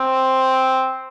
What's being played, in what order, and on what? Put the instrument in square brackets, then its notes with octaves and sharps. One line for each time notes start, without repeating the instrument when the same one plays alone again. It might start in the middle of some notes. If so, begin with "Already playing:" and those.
Already playing: [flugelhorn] C4